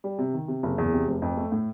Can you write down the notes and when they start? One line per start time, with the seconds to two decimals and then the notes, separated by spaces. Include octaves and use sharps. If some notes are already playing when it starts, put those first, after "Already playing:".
0.04 G3
0.19 C3
0.33 D#3
0.48 C3
0.63 F#1
0.78 E2
0.93 C3
1.07 F1
1.22 F2
1.37 A3
1.52 A2